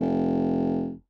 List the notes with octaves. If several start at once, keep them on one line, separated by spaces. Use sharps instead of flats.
F1